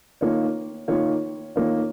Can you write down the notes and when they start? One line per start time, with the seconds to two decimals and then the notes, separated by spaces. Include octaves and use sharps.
0.21 D#3 A#3 F4 C#5
0.88 D#3 A#3 F4 C#5
1.56 D#3 A#3 F4 C#5